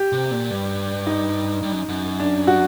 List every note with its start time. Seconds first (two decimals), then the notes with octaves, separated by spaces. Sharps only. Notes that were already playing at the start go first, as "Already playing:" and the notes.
Already playing: G4
0.12 C3
0.31 A#2
0.50 G2
1.07 D#4
1.63 G2
1.72 F#2
1.89 F#2
2.20 D4
2.47 F#4